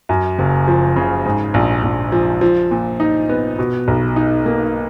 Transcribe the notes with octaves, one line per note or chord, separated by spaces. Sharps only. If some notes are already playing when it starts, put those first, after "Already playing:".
F#2
F#1
F3
C#3
G#2
A#1
A#1
F3
F3
A#2
D#4
B3
B2
B1
D#4
A#3